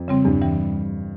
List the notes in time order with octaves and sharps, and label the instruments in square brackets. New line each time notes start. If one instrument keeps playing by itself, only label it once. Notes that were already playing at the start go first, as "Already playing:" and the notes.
Already playing: [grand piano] F2
[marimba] C#3 G3 C4
[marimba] E2 [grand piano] G2
[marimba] E3 G3